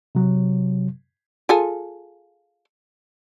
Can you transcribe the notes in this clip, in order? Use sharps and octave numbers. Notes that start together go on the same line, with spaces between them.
C3 F#3
F4 G#4 A4